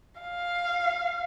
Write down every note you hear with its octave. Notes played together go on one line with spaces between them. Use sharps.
F5